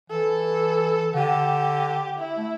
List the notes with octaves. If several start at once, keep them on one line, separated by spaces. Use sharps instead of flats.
E3 A4
D3 G4
E4
A3